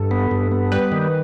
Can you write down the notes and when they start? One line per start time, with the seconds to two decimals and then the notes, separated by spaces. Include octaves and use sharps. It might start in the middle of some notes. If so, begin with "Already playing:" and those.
Already playing: G2 A4
0.11 B3
0.31 G2
0.52 B3
0.72 G3 B4
0.92 D#3